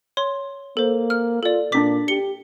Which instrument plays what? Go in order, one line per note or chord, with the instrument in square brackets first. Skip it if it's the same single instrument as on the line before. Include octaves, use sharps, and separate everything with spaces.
[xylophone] C#5 C6
[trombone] A#3 [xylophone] A4 C5
[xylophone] F6
[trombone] F4 [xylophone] A4 D5
[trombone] A#2 [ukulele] D4 D#4 D5 [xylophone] D6 B6
[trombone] G4 [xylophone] C#7 G7